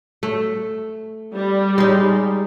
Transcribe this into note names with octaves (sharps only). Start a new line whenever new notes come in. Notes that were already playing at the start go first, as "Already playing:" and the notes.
A3
G3
G#3 D#4